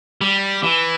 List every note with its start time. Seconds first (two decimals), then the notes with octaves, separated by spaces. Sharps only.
0.21 G3
0.63 E3